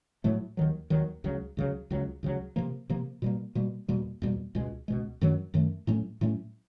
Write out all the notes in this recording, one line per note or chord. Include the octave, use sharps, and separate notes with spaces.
A2 F#3 A3
D#2 D#3 F#3
D#2 D#3 F#3
C#2 C#3 F#3
C#2 C#3 F#3
C#2 C#3 F#3
C#2 C#3 F#3
C3 F3 A#3
C3 F3 A#3
B2 G3 A#3
B2 G3 A#3
E2 B2 G3 A#3
E2 B2 G3 A#3
C#2 B2 G#3
C#2 B2 G#3
F#2 D#3 F#3 A3
F#2 D#3 F#3 A3
A2 F#3 A3 C#4
A2 F#3 A3 C#4